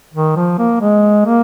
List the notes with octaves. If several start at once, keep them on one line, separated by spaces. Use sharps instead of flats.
D#3
F3
A#3
G#3
A#3